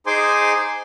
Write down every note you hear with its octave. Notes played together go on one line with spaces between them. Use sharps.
D#4 G#4 C5 G#5 C6 D6